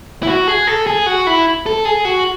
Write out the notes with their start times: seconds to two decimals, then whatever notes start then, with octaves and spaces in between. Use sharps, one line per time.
0.23 E4
0.27 F#4
0.48 G#4
0.67 A4
0.87 G#4
1.06 F#4
1.27 E4
1.66 A4
1.85 G#4
2.05 F#4